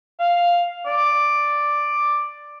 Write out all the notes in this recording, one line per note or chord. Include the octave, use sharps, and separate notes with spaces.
F5
D5